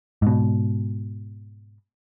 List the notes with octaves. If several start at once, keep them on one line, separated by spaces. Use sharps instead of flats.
G#2 B2